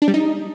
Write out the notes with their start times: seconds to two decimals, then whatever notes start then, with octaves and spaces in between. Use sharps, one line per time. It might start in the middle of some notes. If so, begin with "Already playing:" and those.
0.02 D4
0.08 G3
0.14 D#4